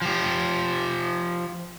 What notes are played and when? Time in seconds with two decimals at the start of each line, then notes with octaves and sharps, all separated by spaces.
0.02 F3 G4